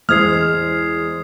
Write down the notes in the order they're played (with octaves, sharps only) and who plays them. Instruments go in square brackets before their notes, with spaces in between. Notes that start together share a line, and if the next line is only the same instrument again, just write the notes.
[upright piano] E2 G#3 C5 [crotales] D#6 G#6 C7 [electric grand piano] F6